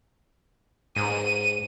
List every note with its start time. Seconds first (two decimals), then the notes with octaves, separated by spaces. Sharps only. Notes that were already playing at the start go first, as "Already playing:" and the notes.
0.96 G#2 D#7